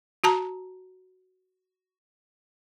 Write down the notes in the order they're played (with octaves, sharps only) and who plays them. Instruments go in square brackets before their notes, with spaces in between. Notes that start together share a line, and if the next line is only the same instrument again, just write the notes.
[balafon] F#4 A5 A#5